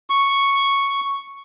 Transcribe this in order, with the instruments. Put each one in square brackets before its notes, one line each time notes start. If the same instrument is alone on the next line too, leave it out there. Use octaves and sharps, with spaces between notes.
[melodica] C#6